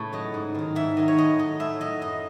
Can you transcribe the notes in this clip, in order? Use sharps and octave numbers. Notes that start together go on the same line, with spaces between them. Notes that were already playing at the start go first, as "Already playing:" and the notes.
Already playing: A2 C#3 A4 B4 C#5
F#3 D#5
G#2
D#3 F#3
G#2 E5
D#3 F#3 D#5
C#5
A2 D#5
F#3 D#5
A2 E5
F#3 D#5
F#2 D#5